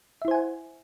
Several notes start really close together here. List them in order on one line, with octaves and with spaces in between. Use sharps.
E5 E4 C5 G#5 F#5